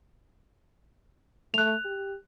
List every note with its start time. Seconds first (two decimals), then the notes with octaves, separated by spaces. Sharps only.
1.54 A3 F#6 F7
1.85 G4